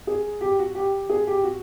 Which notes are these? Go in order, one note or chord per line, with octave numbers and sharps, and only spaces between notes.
G#4
G4
F#4
G4
G#4
G4
F#4